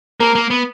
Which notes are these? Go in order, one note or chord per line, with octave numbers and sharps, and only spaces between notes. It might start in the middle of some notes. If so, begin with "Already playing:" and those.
A#3 A#4
A#3
B3